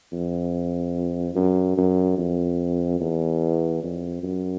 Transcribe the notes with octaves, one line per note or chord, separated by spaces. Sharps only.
F2
F#2
F#2
F2
E2
F2
F#2